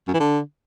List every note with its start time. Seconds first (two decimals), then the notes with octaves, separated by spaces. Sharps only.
0.07 F#2
0.14 E3
0.20 D3